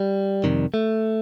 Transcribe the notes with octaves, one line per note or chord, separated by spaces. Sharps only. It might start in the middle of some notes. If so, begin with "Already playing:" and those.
Already playing: G3
F2 C3 D#3
A3